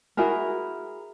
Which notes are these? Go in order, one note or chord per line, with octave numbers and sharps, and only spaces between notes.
E4 F#4 G#4 A#4